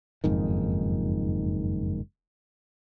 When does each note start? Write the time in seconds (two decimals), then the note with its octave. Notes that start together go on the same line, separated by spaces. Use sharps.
0.24 F#1 F2 G#2 D#3